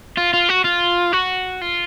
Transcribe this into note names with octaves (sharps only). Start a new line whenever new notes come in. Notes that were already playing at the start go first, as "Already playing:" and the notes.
F4
F4
F#4
F4
F#4
F4